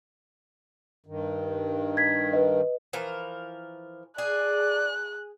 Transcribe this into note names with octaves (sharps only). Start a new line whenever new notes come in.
G2 D#3
G#6 B6
B4 D#5
E3 F3 A#4
G#4 D5 F#6